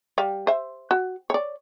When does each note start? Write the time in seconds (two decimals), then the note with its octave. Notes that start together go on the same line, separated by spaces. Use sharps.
0.18 G3 F5
0.47 C5 E5
0.91 F#4
1.30 C#5 D5